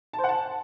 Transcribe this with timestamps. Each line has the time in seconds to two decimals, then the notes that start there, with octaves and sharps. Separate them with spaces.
0.13 A5
0.19 C5
0.24 F#5
0.29 A5